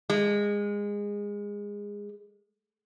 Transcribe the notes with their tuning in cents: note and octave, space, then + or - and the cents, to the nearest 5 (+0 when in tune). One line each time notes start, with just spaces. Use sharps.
G#3 -20